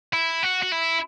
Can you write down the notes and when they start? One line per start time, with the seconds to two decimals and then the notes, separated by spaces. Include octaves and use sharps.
0.13 E4
0.43 F#4
0.62 F#4
0.72 E4